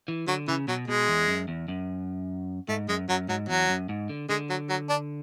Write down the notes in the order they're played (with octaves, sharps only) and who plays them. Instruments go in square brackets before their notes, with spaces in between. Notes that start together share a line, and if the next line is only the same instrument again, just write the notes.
[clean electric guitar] E3
[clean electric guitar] D3 [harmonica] F#3
[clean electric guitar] C#3 [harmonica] E3
[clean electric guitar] B2 [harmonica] F#3
[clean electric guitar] B2 [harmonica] G#3
[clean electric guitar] E2
F#2
E2
F#2
[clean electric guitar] G#2 [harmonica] A3
[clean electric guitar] F#2 [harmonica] G#3
[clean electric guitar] F#2 [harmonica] F#3
[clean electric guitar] G#2 [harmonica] F#3
[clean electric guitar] E2 [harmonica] F#3
[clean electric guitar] F#2
G#2
D3
[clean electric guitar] D3 [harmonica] G#3
[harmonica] F#3
F#3
D4